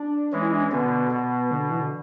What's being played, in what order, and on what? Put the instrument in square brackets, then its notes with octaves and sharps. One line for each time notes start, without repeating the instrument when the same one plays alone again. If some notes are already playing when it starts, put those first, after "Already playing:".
Already playing: [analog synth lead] D4
[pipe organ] E3 G#3 [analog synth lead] C#4
[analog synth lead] E4
D4
C#4
[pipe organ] B2 D3 [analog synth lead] B3
[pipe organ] B2
[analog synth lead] D3
E3
D3